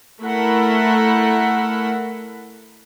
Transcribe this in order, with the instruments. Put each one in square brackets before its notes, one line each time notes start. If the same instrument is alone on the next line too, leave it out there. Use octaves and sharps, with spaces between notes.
[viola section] A3 E4 A4 A#4 F#5 B5